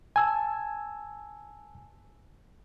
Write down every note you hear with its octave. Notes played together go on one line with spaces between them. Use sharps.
G#5 A5 E6